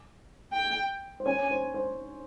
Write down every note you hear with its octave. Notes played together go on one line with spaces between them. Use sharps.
G5
C5
C#4 C#5 G#5
C5
C5